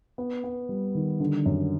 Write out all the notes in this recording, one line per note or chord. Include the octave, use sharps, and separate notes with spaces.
B3
B3
G3
D#3
D3
F#2